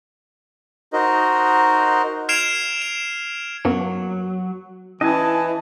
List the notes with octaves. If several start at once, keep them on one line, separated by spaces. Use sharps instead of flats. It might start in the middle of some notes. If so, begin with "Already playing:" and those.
D#4 F#4 A#4 C5 D#5
F6 G#6 C7 D7 E7 F7
E7
F#2 F#3 A#3 B3
E3 C#4 E4 D#5 G#5 A5 E6